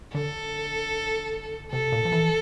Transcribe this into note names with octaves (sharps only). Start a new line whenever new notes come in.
D3 A4
C3 A4
A#2
F3
E3